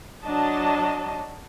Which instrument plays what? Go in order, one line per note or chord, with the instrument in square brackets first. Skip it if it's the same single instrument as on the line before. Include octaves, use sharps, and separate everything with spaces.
[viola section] F#3 D4 D#5 A5